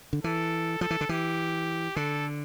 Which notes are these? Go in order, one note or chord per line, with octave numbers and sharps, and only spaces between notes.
D3
E3 A4
F3 A4
E3
D3
E3 G4
D3 A4